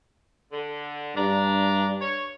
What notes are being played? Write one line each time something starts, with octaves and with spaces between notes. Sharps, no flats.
D3
G2 D4 A#5
C#5